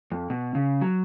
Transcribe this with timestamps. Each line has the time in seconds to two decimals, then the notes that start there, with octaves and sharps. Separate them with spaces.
0.12 F2
0.30 B2
0.55 C#3
0.81 F#3